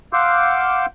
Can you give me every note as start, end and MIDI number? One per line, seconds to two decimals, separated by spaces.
0.13 0.86 77
0.13 0.86 78
0.13 0.86 84
0.13 0.86 86
0.13 0.86 88
0.13 0.86 91